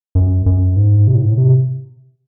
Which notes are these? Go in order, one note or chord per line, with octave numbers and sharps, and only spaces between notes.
F#2
F#2
G#2
C3
A2
G#2
A2
C3